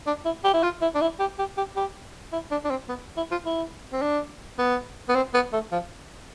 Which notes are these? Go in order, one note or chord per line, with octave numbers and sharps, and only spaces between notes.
D4
E4
G4
E4
F4
E4
D4
E4
G4
G4
G4
G4
E4
D4
D4
C4
B3
E4
F4
E4
C4
D4
B3
B3
C4
B3
A3
F3